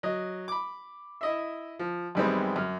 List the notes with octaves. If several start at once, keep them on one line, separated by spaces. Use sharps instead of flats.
F#3 D#5
B5 D6
E4 D#5 E5
F3
F#2 D#3 G3 G#3 B3 C4
F#2 F6